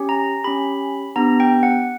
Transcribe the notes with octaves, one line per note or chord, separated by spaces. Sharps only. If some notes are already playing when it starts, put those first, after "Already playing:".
Already playing: C#4 G4
A#5
C#4 G4 B5
B3 D4 G4 A#5
G5
F#5